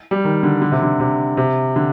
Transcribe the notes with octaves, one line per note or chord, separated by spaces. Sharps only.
G3
D#3
D3
D3
C3
D3
C3
C3
D3